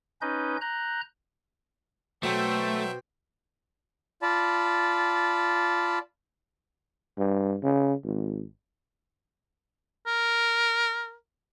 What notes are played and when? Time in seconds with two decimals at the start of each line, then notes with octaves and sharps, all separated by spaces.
0.21 C#4 D#4 B4 D#5 G6
0.61 A#5 F#6 G6
2.23 B2 F#3 A3 C5 E5 G5
4.22 F4 D5 A5 B5
7.17 G2
7.63 C#3
8.04 G#1
10.07 A#4